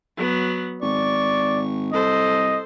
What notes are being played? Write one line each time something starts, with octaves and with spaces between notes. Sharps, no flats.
F#3 B3
G#1 D5 C#6
C2 A4 C5 D#5